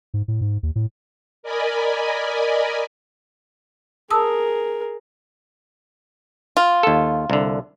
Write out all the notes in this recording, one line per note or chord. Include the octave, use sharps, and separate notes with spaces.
G#2
A2
G#2
D#2
A2
A#4 D5 D#5 G#5 B5
G#4 A#4 A5 D#6 E6
F4
D#2 A4
C2 D3